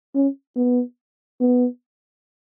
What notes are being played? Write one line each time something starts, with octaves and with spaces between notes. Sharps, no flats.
C#4
B3
B3